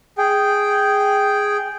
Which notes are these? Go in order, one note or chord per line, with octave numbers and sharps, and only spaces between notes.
G#4 G5